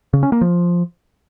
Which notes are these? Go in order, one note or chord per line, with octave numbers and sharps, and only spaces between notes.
C#3
C#4
A#3
F3